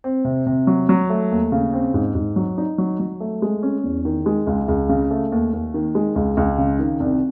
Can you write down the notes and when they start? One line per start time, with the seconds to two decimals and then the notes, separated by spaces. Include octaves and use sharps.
0.04 C4
0.25 C3
0.46 C3
0.67 F#3
0.89 F#3
1.10 A3
1.31 D#2
1.52 C#3
1.73 C4
1.94 G#2
2.15 G#2
2.36 F#3
2.58 D#4
2.78 F#3
3.00 F#3
3.20 A3
3.42 G#3
3.63 C#4
3.84 E2
4.05 D#3
4.26 G#3
4.47 C#2
4.68 C#2
4.89 C#3
5.11 A3
5.32 D#2
5.53 D#2
5.74 D#3
5.95 G#3
6.16 C#2
6.37 C#2
6.58 C#3
6.79 D#3
7.00 C2